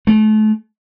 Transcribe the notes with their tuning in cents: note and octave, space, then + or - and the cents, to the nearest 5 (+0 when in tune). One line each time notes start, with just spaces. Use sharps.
A3 -35